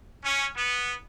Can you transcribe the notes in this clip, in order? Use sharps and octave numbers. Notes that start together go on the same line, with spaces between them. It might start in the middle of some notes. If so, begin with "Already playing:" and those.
C#4
B3